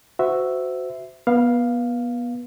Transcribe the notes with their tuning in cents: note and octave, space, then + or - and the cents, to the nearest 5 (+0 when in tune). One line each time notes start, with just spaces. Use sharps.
F#4 +0 C5 -30 E5 +0
B3 -30 F5 +0